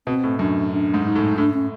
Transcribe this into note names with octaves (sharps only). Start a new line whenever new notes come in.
B2 C4
A2
F#2 D4
D4
G#2
D#4
A2
A2 D4
C#4